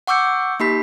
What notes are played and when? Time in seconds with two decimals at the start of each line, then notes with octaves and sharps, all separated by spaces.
0.07 F#5 C#6 D6 E6 G6 C#7
0.60 A#3 D#4 G4 B5 B6